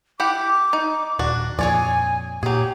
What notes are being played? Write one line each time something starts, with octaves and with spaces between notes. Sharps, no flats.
E4 G4 F#5 D6
D#4
D#1 D4 F#4
F2 A#2 F3 G#4 C#5 D5 G#5
A#2 F#3 G4 G#4